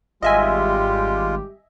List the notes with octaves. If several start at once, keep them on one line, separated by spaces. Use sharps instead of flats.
G#1 G3 G#3 F4 G4 D#5 E5 G#5